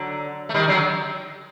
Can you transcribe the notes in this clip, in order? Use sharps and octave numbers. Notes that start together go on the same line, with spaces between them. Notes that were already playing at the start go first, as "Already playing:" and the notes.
Already playing: D3 F#3
A3
D#3 G3
D3 F#3